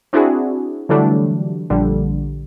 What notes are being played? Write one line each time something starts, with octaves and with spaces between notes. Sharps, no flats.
C4 D4 E4 F#4 G#4
D3 E3 F#3 G3 A3 D4
A#1 D3 G3